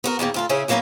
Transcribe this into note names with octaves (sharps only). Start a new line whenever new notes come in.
B3 F#4 A#4
E2 B2 D#3 A#3
D2 F4 A4
C#3 C#4 E4 G#4
F3 F#3 A#3 B3 C#4 E4